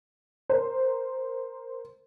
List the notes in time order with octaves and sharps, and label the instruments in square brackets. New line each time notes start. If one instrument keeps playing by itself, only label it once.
[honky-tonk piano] A#4 C5